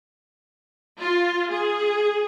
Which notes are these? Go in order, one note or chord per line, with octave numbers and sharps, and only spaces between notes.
F4
G#4